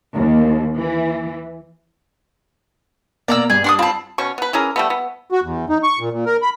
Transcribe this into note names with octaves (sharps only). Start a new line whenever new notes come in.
D#2
E3
B2 A#3 D5 A#5 E6
G2 G#4
D4 C6 D#6
C4 F4 A4 B5
B2 C#4 C#6
B3 B4
E3 C#4 G#4 A#4
G3 A3 B3
B3
F#4
E2
D#4
C#6
A#2
A#2
A#4
B5